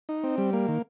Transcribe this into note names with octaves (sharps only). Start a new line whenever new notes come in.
D#4
C4
G3
A#3
D#3